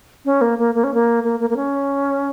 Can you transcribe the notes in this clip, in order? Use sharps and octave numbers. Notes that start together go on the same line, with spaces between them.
C#4
A#3
A#3
A#3
C#4
A#3
A#3
A#3
A#3
C#4